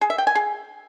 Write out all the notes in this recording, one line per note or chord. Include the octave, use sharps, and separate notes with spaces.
G#4
E5
G5
G#5
G#4